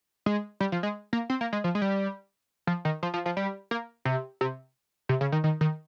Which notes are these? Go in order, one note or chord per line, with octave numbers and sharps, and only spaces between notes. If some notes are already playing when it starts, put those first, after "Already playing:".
G#3
G3
F3
G#3
A#3
C4
A#3
G#3
F3
G#3
G3
F3
D#3
F3
F3
F3
G3
A#3
C3
C3
C3
C#3
D#3
D#3
D#3